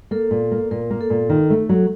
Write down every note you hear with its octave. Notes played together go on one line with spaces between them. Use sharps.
A#3 A4
A#2
A#3
A#2 A#4
A#3
A4
A#2
D#3
A3
F#3